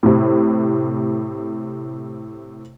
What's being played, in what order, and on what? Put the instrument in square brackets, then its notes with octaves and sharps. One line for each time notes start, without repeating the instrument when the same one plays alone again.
[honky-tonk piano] A2 C3